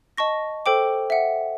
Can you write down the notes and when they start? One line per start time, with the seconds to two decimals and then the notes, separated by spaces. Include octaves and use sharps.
0.17 D#5 A5 C#6 A#6
0.66 A4 C5 G5 D6
1.10 E5 F#5